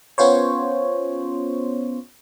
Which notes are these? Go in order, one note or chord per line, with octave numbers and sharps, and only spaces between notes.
B3 C#4 F4 C5 C#5